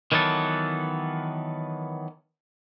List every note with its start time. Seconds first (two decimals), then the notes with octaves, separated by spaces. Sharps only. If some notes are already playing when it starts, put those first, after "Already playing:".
0.12 D#3 E3 F#3 B3 A4